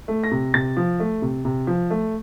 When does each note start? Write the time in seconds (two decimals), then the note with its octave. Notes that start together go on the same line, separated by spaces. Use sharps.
0.08 A3
0.24 A#6
0.31 C3
0.54 C3 A6
0.77 F3
1.00 A3
1.22 C3
1.45 C3
1.67 F3
1.90 A3